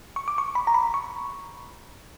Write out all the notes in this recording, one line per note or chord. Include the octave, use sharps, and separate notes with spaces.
C#6
D6
C#6
B5
A#5
B5
C#6